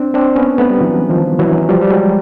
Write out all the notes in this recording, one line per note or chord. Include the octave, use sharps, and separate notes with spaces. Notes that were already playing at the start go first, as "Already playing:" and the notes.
Already playing: C4 D4
C4 D4
B3 C#4
A3 B3
G3
E3 F#3
D#3 F3
E3 F#3
F3 G3
G3
F#3 G#3